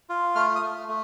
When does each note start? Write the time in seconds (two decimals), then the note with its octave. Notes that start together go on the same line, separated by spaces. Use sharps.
0.09 F4
0.35 A3 F6
0.55 D#6
0.62 A3
0.88 A3